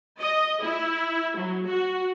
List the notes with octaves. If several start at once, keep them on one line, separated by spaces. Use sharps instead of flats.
D#5
E4
F#3
F#4